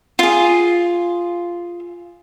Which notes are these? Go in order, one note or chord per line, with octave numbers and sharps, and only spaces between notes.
F4 G#4